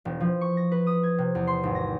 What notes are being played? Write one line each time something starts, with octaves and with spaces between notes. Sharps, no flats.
E1
F3
C#6
A#6
B4
D#6
G#6
C3
E2
C6
G#1
A#6